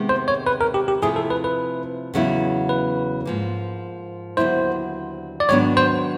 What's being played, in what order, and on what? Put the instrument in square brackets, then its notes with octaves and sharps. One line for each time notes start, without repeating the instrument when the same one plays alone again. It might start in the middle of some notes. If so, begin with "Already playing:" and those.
Already playing: [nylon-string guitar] C3 D#3 G#3 B3
[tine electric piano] C5
C#5
B4
A#4
G4
G4
[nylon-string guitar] C3 F3 A3 C4 E4 [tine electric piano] G#4
[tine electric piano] A4
B4
B4
[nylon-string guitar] E2 C#3 F#3 B3 E4
[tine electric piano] B4
[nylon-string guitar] G#2 F3 A#3
[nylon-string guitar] D#2 D3 F#3 B3 E4 [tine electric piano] C5
[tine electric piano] D5
[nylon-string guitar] G#2 D#3 F#3 B3 D4 [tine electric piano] C#5
[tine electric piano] C5